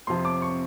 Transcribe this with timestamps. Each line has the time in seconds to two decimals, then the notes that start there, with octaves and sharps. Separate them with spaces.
0.07 F2 C3 F3 C6
0.25 D6
0.42 C#6